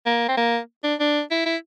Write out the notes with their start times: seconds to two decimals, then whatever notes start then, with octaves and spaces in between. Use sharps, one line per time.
0.06 A#3
0.28 C4
0.37 A#3
0.83 D4
1.00 D4
1.31 E4
1.45 E4